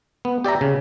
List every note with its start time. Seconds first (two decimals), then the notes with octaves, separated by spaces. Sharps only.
0.25 B3
0.44 G4 D5 E5 A#5
0.61 C#3